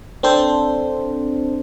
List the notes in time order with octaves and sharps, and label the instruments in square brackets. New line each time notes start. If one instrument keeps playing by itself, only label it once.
[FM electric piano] C4 D4 A4 C5